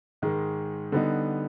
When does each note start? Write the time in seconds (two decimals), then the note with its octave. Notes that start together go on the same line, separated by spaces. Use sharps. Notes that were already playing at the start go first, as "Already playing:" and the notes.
0.22 G#2 D#3 G#3
0.92 D3 G3 B3 D#4